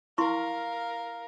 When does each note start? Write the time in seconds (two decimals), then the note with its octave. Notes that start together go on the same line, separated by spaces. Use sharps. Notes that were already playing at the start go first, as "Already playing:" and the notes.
0.18 E4 A#4 F5 C6 C#6